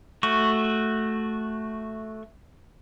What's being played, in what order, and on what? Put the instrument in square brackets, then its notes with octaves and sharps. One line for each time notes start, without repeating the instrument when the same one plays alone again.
[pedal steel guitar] A3 F#4 C#6